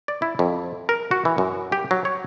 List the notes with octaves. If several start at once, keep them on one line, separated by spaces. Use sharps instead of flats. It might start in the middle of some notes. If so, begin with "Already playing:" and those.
D5
E4
F2
A#4
F#4
E3
F#2
G4
F#3
C#5